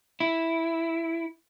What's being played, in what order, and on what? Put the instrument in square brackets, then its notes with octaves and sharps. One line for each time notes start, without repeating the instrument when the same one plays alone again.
[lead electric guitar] E4